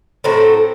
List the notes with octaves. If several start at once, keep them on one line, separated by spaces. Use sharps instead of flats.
A2 F#3 A3 C4